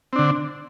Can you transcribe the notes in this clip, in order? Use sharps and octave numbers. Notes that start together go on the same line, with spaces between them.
D3 C4 D4